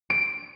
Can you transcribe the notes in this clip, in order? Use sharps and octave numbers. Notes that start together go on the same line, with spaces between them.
D7